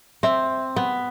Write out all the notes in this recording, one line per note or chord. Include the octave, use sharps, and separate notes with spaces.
C4 E5
B3